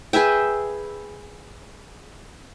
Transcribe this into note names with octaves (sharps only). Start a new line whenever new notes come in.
G#4 B4 E5 G5